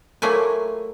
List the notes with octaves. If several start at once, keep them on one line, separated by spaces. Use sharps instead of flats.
F#3 A3 A#3 E4 F4 G#5